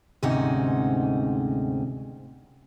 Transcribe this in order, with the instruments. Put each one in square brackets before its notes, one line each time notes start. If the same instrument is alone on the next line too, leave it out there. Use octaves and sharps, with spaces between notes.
[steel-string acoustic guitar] D2 G#2 C3 C#4 D#4 F#5